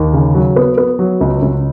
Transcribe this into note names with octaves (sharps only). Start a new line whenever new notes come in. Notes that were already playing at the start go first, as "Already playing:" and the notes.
Already playing: D#2
C#3
F#3
B3
B3
F#3
C#2
C#2